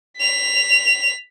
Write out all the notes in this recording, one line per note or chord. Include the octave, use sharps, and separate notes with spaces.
B6 F7